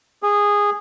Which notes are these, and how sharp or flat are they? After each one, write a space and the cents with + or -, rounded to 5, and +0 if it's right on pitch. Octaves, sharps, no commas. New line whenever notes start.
G#4 -15